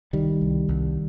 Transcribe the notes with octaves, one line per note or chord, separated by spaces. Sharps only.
C2 D#3 G3
C2
C2